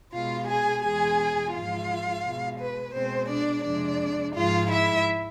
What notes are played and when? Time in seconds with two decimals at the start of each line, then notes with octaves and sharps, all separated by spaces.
0.13 B2 G#3 F4 F5
0.47 G#4 G#5
0.83 E2 B2 G#3 G#4 G#5
1.53 G#2 F3 G#3 F4 F5
2.24 B2 G#3
2.59 B4
2.93 B2 G#3 C4 C5
3.30 D4 D5
3.64 F2 C3 G#3 D4 D5
4.34 G#2 F3 G#3 F4 F5
4.70 E4 E5